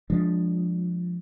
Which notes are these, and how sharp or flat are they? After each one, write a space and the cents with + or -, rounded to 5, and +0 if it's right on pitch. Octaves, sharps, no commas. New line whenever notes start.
F3 +10 G#3 +0 D4 +0